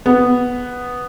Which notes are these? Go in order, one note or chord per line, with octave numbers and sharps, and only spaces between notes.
B3